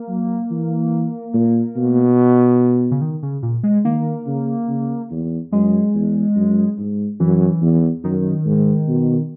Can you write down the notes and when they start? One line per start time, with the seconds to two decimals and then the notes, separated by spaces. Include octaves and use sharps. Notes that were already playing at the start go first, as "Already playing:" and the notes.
Already playing: A#3
0.08 F#3
0.50 E3
1.34 A#2
1.76 B2
2.91 C#3
3.01 D#3
3.23 C#3
3.42 A#2
3.63 G#3
3.85 D#3 A#3
4.27 C#3
4.69 C#3
5.11 E2
5.52 F#2 G#3
5.95 E2
6.36 F#2
6.78 G#2
7.20 F#2 E3
7.62 E2
8.04 F#2 D#3
8.45 G#2
8.88 B2